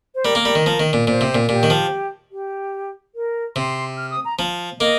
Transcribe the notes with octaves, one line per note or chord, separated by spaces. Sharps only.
C5
G3 A#4
A#3
G3
D#3
F3
D#3
A#2
A#2 C5
C3
A#2
A#2 G4
D#3
F3
G4
A#4
C3 C6
F6
D#6
A#5
F3
A#3 D#5